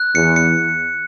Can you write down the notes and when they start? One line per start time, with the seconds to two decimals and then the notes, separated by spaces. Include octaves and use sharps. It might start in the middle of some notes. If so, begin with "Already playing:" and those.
Already playing: F#6
0.15 E2 C#7
0.36 C#7